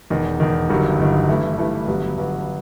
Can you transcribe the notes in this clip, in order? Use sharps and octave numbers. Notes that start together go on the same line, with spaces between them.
E1 E2 D#3
E1 E2 D#3
G1 G2 D#3 F#3
G1 G2 D#3 F#3
G2 E3 A3 E4
G2 E3 A3 E4
G1 G2 F#3 B3
G1 G2 F#3 B3